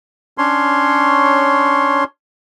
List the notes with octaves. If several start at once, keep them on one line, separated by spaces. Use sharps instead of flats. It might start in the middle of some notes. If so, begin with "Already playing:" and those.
C#4 D4 C#5 C6